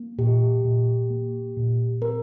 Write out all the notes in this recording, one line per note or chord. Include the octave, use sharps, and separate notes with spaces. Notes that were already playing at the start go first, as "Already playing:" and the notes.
Already playing: A#3
A#2 G4
A#2
A#3
A#2
C4 A#4